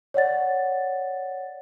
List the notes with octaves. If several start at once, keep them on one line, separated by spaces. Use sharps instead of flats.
C#5 D5 F#5 A6